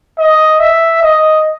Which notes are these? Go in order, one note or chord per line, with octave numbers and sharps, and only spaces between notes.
D#5
E5
D#5